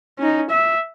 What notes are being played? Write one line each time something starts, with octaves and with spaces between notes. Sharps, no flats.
C#4 D#4
E5